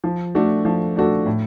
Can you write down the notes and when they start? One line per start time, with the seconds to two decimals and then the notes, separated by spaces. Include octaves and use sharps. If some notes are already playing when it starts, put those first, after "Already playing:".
0.04 F3
0.35 A3 D4 F#4 A4
0.65 F3
0.96 A3 D4 F#4 A4
1.26 A2